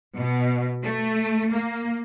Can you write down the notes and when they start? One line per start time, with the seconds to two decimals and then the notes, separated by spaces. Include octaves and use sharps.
0.18 B2
0.84 A3
1.53 A#3